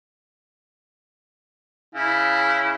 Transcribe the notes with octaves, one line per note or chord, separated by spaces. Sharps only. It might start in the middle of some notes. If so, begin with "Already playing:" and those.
C#3 E4